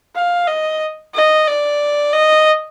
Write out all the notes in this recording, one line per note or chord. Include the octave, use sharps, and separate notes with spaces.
F5
D#5
D#5
D5
D#5